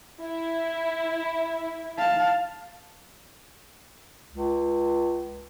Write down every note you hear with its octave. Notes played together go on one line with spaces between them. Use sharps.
E4
F5 A5
C#2